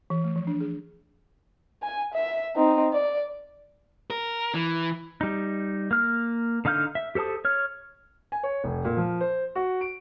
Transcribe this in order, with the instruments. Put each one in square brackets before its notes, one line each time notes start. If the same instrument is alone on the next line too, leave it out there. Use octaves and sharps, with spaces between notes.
[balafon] E3
A3
F3
D4
G#4
[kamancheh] G#5
E5
C4 D#4
D5
[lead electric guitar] A#4
E3
[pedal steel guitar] G3 D#4
A#3 F6
D3 D#4 F5 F6 G6
E5
G4 A4 C5 A5 D#6
C#5 F6
[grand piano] G#5
C#5
F1
A#2
F3
C5
F#4
D7